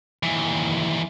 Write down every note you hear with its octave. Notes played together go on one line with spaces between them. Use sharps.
D#2 E3